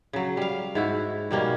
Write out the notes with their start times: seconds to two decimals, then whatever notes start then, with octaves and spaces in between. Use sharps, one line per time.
0.13 C#3 F#3
0.37 G3 F5
0.75 G#2 E4 F#4
1.31 B2 G3 A#3 C#4